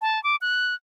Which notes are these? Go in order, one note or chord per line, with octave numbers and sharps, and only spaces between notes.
A5
D6
F#6